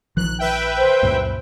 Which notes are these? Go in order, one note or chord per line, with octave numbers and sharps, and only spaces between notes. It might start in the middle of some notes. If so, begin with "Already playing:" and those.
A#1 D#3 F3 F#6
B4 E5 G5
C5
C#2 F#2 A#2